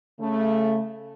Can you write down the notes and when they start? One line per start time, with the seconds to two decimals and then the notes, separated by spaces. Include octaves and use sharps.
0.20 C#3 A3